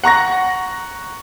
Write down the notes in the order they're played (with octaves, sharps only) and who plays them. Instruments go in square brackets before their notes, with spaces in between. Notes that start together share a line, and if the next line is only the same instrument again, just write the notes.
[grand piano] F#5 A#5 C#6 A#6